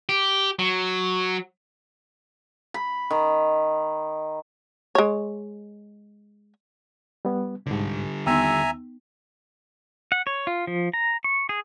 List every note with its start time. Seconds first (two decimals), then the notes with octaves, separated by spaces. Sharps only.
0.09 G4
0.59 F#3
2.74 B5
3.11 D#3
4.95 G#3 C#5
7.25 G3 B3
7.66 C2 G#2 D3 G3
8.26 D#2 B3 D#4 E5 G#5 A#5 E6
10.12 F#5
10.27 C#5
10.47 F4
10.67 F3
10.94 A#5
11.24 C#6
11.49 G#4